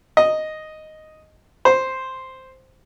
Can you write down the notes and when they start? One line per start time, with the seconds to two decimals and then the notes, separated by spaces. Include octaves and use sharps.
0.17 D#5
1.65 C5